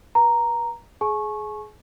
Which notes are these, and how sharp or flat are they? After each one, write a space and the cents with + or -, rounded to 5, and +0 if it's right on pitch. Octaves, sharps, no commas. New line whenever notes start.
B4 -30 A#5 +0
G#4 +20 G#5 +40 C#6 -15